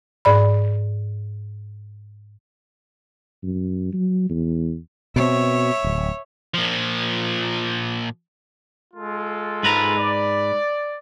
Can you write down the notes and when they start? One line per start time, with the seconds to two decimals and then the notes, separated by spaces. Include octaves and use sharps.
0.25 G#2 D5 B5
3.44 F#2
3.93 F#3
4.30 E2
5.16 B2 C4 C#5 E5
5.84 D1
6.54 A#2 F3
8.94 G#3 F4 A4
9.63 G#2 B4 A#5
9.97 D5